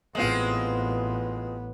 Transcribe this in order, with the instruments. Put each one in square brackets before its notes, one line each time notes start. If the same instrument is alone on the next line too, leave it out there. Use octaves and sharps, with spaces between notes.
[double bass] A1 B3 [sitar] G#3 C4 F4